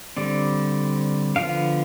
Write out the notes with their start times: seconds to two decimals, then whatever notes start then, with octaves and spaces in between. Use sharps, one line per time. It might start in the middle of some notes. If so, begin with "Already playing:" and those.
0.17 D3 G3 C4 D5
1.36 D3 F3 B3 F5